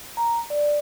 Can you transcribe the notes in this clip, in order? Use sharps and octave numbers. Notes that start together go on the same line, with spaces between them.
A#5
D5